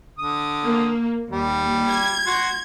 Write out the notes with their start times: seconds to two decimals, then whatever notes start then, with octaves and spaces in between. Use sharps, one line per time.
0.19 D3 D#6
0.64 A#3
1.31 D#2 G3
1.87 G#6
2.27 F#4 C6